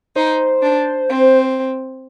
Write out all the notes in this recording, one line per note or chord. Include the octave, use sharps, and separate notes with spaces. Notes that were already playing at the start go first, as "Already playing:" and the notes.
D#4 C5
D4
C4